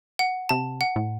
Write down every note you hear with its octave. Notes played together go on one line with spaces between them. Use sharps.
F#5
C3 A5
F#5
A2